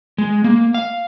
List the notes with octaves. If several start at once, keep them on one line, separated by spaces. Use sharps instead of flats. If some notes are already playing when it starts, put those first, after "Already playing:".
G#3
A#3
F5